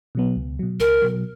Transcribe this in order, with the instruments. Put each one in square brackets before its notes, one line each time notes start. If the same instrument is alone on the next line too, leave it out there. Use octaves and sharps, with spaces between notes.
[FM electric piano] B2 F#3 B3
C#2
B2 F#3
[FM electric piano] C#2 [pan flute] A#4
[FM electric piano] B2 F#3